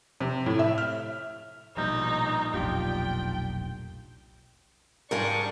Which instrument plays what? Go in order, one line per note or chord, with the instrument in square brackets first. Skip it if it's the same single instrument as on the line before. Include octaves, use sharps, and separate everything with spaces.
[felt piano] C3
A2
E5
F6
[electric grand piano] A#1 G3 G6 [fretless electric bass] B2 [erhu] D#4
[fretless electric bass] F1 B1 A#2 [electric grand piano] D4 F4 G4 [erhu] G5
[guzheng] G#2 G3 F4 [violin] D4 C#6 [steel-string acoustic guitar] G#4 A#4